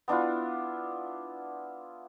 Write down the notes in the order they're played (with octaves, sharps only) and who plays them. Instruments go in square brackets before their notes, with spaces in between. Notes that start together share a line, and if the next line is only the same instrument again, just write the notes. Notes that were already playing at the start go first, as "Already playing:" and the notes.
[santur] B3 D4 E4 F4